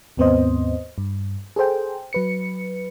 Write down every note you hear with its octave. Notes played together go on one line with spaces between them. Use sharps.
D#2 G#2 B3 C4 C5 D#5
G2
G#4 A4 C5 G5
F#3 B4 C#7